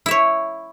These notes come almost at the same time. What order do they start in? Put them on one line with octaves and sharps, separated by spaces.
E4 E5 C#5